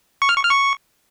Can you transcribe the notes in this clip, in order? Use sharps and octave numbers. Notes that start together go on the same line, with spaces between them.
C#6
F6
C#6
F6
C#6